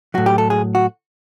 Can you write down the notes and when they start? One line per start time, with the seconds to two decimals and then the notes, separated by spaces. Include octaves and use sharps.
0.14 A2 F#3 F#4
0.26 G4
0.38 A4
0.50 G#4
0.75 F#4